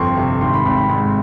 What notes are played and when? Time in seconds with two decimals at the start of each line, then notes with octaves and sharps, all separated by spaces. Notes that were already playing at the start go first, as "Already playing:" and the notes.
Already playing: G1 F2 F3 C6 C#6
0.17 C3
0.41 G#1 C6
0.54 B5
0.65 G#1 B5
0.77 B5
0.89 G#2 B5